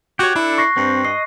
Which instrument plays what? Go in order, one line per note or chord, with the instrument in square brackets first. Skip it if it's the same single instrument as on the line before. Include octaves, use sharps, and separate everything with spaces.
[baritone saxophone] F#4 [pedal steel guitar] G4 C#5 [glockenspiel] F#6
[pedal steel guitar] D4 A4 [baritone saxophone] E4
[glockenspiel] C#6 A#6 C7
[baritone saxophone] G2 [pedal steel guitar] C4
[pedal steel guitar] D#5 [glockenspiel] C7